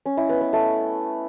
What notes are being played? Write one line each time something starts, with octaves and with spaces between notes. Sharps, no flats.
C#4
E4
B3
B3
A3